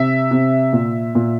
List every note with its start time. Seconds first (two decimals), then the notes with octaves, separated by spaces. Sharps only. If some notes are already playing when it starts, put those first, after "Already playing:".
Already playing: C3 E5
0.31 C3
0.73 A#2
1.15 A#2